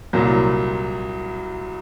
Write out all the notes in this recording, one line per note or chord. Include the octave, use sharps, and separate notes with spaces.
C2 A#2 F#3